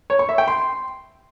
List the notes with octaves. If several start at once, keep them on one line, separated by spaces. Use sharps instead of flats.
C#5
C#6
E5
G5
C6